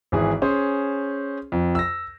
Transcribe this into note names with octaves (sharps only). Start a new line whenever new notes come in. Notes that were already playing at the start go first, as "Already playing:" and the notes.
G#1 E3 G#4
C#4 G#4 C5
F2
E6 A#6